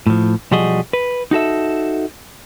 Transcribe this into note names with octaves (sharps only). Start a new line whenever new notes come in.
A2 F3
B1 F3 G3 F#4 G#4 D#5
B4
D#4 F#4 A4 E5